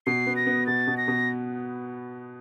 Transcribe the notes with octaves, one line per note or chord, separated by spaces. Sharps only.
B2 C7
B3
A#6
B3
B2 A6
B2
A#6
B2